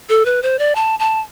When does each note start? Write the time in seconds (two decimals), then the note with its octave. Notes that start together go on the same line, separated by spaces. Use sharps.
0.09 A4
0.25 B4
0.42 C5
0.59 D5
0.75 A5
0.99 A5